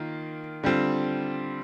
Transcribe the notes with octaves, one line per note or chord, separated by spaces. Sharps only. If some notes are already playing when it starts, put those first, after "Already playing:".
Already playing: D#3 A#3 F4
D3 G3 C4 F4